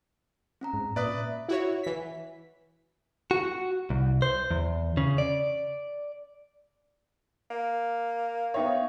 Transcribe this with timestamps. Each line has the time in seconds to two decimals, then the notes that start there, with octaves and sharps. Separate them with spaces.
0.61 C4 C#4 A#5
0.74 G#2
0.96 A#2 B4 D5 E5 D#6
1.49 E4 F#4 C#5
1.83 E3 B6
3.31 F#4
3.90 C2
4.22 C5
4.51 E2
4.97 C#3
5.18 D5
7.51 A#3
8.54 B3 D#4 C#5 E5 F5 G5